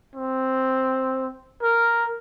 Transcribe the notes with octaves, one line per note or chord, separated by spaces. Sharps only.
C4
A#4